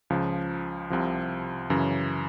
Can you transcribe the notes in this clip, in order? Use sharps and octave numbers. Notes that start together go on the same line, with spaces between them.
C#2 C#3 F3
C2 C3 F3
F#2 C#3 E3